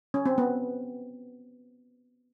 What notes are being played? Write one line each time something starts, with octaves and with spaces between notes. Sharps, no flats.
C#4
C4
B3